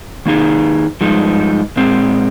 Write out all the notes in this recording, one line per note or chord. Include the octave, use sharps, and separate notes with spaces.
D#3 A#3 D#4 G#4
G2 F3 G#3 D#4
A#2 G#3 C4